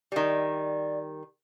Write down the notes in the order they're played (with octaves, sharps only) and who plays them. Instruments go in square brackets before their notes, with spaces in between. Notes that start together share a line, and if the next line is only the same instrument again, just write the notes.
[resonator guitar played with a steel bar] D#3 G3 [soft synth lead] D5